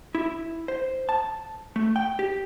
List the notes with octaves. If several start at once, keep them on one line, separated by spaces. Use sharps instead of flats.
E4
C5
A5
A3
G5
G4